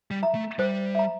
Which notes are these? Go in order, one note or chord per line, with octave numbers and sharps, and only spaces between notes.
G3
E5 A#5
A3
G3 C5
E5 A#5